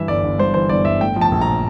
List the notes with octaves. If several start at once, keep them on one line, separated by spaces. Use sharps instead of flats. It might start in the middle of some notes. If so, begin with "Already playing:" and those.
Already playing: G2 E3 E5
G1 D5
G1
G2 C5
E3 C5
G1 D5
G1 E5
A2 G5
F3
A5
A#1
A#5